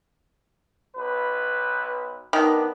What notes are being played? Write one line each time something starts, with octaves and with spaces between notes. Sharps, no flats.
B1 B4
D#3 B3 D4